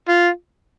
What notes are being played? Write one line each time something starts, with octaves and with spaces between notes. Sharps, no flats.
F4